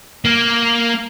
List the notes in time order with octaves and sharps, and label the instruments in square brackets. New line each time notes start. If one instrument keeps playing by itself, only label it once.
[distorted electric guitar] A#3